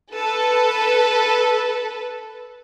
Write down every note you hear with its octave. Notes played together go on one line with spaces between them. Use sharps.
A4 B4